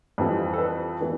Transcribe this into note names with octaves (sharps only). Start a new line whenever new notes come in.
F2 E3 G3 C4
A4
B4
E3 B3